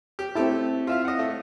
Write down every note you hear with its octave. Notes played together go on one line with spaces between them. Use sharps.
G4
A3 C4 E4 G4 A5
F4 E5 F5
D#5 F#5
A3